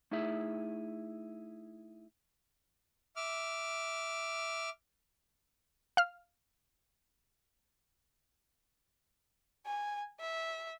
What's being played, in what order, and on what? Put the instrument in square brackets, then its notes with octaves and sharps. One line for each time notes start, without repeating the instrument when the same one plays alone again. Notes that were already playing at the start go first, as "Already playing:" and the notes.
[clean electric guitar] A3 D#4 E4 G#4 E5
[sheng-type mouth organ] E5 D6 F6
[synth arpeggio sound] F5 F6
[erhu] G#5
E5